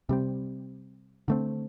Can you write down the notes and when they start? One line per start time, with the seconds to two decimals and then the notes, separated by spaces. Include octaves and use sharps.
0.09 C3 G3 C4
1.28 D3 A3 C4